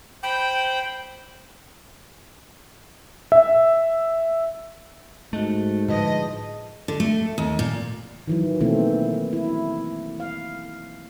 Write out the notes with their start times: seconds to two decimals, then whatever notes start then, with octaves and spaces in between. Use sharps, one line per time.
0.23 C5 G5 B5
3.32 E5
5.33 G#2 A3 F#4 D#5
5.88 A2 D3 F3 G#4 B4 D#5 A5
6.88 D3
7.00 A3
7.38 D#2
7.59 A#2
8.27 D#3 E3 F#3
8.60 B2 D#3 E3 A3 A#3 C4
9.33 E4
10.20 F5